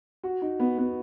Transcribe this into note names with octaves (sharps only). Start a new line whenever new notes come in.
F#4
D#4
B3
B3